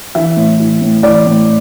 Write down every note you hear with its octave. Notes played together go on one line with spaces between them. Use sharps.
E3 E5
A2
E3
A2
E3 D5
A2